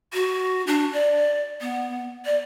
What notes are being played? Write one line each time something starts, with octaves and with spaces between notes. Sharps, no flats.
F#4
D4
D5
B3
D5